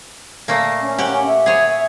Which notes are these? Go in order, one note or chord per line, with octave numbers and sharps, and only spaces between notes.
A#2 A3 A#3
C#4
G4 F#5
E5
G#4 C#5